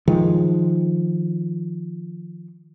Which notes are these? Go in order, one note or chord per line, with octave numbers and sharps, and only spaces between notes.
D#3 F3 G#3